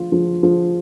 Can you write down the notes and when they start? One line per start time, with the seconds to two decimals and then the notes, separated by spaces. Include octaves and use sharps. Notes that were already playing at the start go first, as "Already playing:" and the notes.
Already playing: F3 F4
0.12 F3
0.43 F3